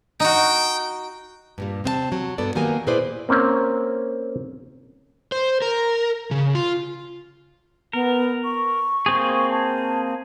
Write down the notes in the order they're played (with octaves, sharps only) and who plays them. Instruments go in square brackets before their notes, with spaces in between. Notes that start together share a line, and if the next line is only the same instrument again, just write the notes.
[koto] D#4 F#4 [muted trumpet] G5
[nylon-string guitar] G2 A#2 G3
C3 C4 D#5 A5
F#3
G2 B3 A4 D5
D#3 F#3 A#3 B3 G4 G#5
A#2 E4 G#4 B4 C5 D5
[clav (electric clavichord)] A#3 C4 C#4
[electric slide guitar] C5
A#4
C#3
F4
[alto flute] B3 [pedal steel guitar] A#4
[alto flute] C#6
[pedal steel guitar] A#3 C4 G#4
[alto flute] A5